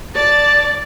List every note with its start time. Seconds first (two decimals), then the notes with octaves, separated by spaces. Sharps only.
0.15 D5 A5